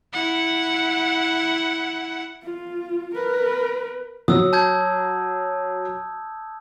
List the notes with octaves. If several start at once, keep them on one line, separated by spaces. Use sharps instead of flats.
E4 F#5
F4
A#4 B4
F#3 D#6 E6
A5 G6 G#6